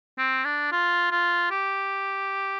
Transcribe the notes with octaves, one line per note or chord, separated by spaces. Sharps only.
C4
D4
F4
F4
G4